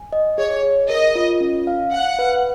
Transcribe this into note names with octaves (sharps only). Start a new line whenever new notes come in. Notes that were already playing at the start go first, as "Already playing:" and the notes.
Already playing: G#5
D#5
G#4 C#5
G#4
A#4 D#5
F4
C#4
F5
F5 F#5
B4